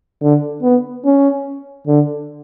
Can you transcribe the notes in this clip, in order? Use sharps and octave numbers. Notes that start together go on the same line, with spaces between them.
D3
B3
C#4
D3